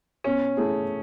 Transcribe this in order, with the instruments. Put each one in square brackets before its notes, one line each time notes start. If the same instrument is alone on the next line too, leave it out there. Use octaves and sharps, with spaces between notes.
[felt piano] B2 [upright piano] C#4
[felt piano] A3 E4 G#4